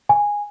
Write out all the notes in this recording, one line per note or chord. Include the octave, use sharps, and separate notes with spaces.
G#5